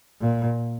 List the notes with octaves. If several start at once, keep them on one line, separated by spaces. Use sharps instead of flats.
A#2